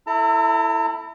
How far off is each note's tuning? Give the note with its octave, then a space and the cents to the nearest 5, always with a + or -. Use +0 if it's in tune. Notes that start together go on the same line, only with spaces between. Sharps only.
E4 +0 A4 +15 A#5 -45